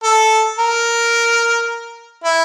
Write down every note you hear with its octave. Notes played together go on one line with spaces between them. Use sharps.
A4
A#4
E4